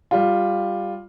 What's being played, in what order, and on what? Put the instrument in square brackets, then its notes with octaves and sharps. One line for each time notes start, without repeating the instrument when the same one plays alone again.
[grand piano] G3 F4